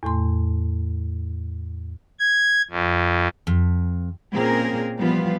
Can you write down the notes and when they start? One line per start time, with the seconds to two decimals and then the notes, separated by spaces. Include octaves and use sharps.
0.03 E2 A2 A3 C6
2.20 G#6
2.70 F2
3.47 F2
4.34 A#2 A#3 C4 C#4 G#4 A#4
4.97 E3 F3 G3 B3 F4